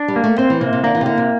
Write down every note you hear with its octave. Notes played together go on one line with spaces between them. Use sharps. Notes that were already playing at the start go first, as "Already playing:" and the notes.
Already playing: D4
G3
A#3
A3
C4 C5
E3
C3 A#3
C3
D3 A#3
E3
C3
D3 A#3
C3